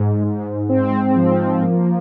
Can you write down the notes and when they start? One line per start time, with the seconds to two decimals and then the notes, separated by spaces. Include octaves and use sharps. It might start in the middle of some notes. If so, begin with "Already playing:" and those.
Already playing: G#2
0.24 G#2
0.69 C4
1.16 F3
1.62 A#3